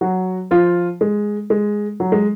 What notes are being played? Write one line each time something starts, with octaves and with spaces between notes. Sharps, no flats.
F#3 F#4
F3 F4
G#3
G#3
F#3
G#3